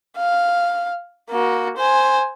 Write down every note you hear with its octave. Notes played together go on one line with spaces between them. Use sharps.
F5
A#3 F#4
C5 G#5